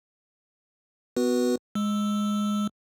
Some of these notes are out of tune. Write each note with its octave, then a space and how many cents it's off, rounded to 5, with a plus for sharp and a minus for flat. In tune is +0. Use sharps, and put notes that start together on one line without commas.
B3 +20 F#4 +0 B4 -20
G#3 +0 E6 +0